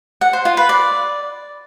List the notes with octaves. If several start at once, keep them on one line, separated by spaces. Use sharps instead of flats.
F#5
C5
F4
B4
D5